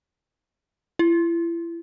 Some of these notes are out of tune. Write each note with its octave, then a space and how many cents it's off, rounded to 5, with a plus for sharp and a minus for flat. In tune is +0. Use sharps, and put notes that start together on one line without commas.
E4 +35